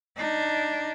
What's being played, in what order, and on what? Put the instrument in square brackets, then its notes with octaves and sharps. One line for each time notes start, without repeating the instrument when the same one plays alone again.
[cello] D4 D#4